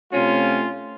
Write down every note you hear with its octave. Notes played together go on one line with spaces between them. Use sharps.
C3 A3 C#4 F4